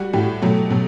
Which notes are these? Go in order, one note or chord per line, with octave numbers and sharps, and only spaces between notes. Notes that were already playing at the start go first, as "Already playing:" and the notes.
Already playing: G3 F#4
A2 G3 G4
B2 F#3 A3
B2 F#3